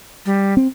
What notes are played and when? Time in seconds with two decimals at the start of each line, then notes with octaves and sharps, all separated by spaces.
0.26 G3
0.57 C4